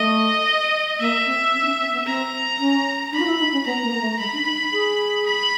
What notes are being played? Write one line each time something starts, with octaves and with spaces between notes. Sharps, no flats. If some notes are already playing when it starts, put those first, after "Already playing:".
Already playing: A3 D#5
A#3 E5
C4
C4
D4
C#4
C4
B3
C4 A#5
C#4
D4 B5
F4
E4
D#4
C#4
B3 A#5
A#3
A#3
A3
G#3 B5
D4
D#4
D#4
G#4
B5